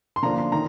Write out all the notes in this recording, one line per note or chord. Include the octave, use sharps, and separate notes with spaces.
C6
D3 F3 A#3 D4 A#5
C6
D#3 A#5